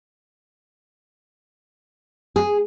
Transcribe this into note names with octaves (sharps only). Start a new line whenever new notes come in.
G#4